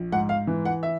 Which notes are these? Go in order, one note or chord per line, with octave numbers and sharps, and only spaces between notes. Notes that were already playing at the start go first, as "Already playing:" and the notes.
Already playing: A#1
G#2 F#5
F5
E3
F#5
E5